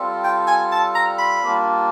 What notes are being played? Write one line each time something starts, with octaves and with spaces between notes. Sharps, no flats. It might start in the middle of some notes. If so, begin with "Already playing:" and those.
Already playing: G3 C4 F4 A4
G5
G#5
A5
A#5
B5
G3 A#3 D4 F4